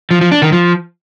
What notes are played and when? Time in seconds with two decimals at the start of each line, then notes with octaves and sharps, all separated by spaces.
0.11 F3
0.21 F3
0.31 D4
0.42 D#3
0.52 F3